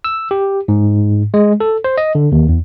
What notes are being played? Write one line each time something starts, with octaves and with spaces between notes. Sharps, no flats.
E6
G4
G#2
G#3
A4
C5
D#5
D3
D#2
E2